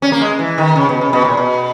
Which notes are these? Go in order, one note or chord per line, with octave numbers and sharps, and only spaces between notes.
C#4
A#3
G#3
E3
D#3
C#3
B2
C#3
B2
A#2
B2